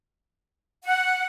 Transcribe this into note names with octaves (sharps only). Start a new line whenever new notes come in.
F#5